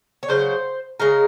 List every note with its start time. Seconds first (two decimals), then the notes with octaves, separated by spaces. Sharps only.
0.23 C#5
0.28 C#3 F#3 C5
1.00 C#3 G#3 A#4